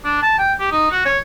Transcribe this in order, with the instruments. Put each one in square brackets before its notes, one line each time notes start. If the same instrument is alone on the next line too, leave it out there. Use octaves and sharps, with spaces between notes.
[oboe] D4
A5
G5
G4
D#4
F#4
C#5